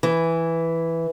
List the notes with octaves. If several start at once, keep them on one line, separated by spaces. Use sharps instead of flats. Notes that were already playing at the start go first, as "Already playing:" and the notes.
E3